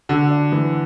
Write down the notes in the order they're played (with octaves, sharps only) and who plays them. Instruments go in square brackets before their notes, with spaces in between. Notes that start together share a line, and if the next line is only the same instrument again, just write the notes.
[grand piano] D3 [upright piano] F#4
[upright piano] D4
E3